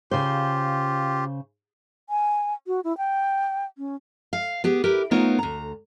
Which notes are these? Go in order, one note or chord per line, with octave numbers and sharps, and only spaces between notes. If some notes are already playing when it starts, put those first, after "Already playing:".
C#3 F4 G4 C5
G#5
F#4
E4
G5
C#4
F5
B3 G4 G#4
E4 G4 A#4 B4
A3 B3 D#4 F4 A#4 C#5
D2 A#5